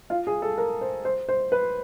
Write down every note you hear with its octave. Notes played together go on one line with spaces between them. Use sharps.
F4
G#4
A4
A#4
C5
C5
C5
B4